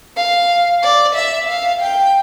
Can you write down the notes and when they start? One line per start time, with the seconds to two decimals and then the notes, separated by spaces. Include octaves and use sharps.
0.17 F5
0.83 D5
1.15 E5
1.49 F5
1.81 G5